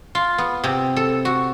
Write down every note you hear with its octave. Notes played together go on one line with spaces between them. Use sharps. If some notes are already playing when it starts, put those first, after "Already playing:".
F4
B3
C3
A4
F#4